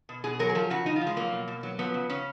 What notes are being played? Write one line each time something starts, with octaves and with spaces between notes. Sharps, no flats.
B2
B2 G#4
F#3 A#4
G#4
F3 A#4
C#3 F#4
C#3 D#4
F4
F3
G#3
F#3 A#3
B2
B2
F#3
F3 B3
C#3
C#3 C#4